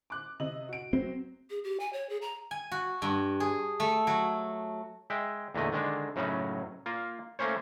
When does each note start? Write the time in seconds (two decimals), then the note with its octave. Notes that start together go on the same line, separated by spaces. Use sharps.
0.10 D6 F#6
0.40 C3 D#5 F#7
0.69 F#4 D7
0.93 F#3 C4
1.50 G#4
1.64 G4
1.80 G#5
1.93 C#5
2.10 G#4
2.22 A#5
2.51 G#5
2.72 F#4
3.02 G2
3.40 G#4
3.80 A3
4.07 F#3
5.10 G#3 E5 G5
5.55 E2 A#2 D3 A3 D#5
5.72 D3 D#3 G#3 D4
6.16 F#2 A2 C#3 F#3 C#4 D#4
6.86 A#3 F4
7.39 A3 A#3 C#4 C5 C#5